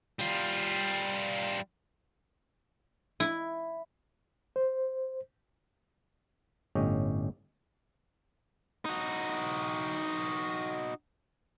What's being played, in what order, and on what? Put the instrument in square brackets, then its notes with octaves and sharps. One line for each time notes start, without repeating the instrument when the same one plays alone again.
[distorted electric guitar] G3 F4
[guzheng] E4
[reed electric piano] C5
[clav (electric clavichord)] G1 A2 C#4 G4 D#5
[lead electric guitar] D#4 F#4